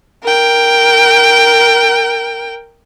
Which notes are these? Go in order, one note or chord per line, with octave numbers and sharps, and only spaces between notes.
A#4 G5